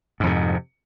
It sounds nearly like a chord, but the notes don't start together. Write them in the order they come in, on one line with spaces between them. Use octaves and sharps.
G#2 F2 C3